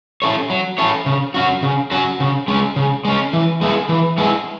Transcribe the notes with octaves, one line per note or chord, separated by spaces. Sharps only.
C#4 E4 A4 C#5
F#3
C#4 E4 A4 C#5
C#3
F#3 C#4 F#4
C#3
F#3 C#4 F#4
C#3
G#3 C#4
C#3
G#3 C#4
E3
G#3 B3 E4 G#4
E3
G#3 B3 E4 G#4